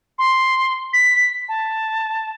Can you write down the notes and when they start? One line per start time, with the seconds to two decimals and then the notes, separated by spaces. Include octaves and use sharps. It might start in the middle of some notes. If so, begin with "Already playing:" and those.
0.19 C6
0.93 B6
1.49 A5